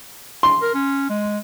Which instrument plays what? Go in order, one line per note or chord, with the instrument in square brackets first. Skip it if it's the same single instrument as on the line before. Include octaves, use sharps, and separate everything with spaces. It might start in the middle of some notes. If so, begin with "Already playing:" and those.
[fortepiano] C6
[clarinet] A#4
C#4
G#3